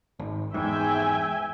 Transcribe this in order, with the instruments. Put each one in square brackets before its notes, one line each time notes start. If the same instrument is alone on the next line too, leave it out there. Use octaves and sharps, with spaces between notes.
[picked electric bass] G#1
[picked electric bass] E2 G#2 [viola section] E5 G5 G#5